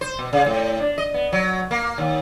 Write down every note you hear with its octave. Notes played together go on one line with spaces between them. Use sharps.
C5
B2
C#3
A2
D4
D#5
B3
F#3
A#3
D#2